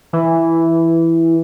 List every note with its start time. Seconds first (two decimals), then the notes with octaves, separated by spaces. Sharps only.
0.13 E3